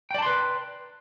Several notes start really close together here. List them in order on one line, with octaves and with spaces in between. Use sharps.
G5 D5 A5 C6 B4